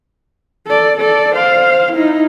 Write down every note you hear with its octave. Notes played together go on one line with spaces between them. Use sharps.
A4 D5
A4 D5
C5 F5
D#4 E4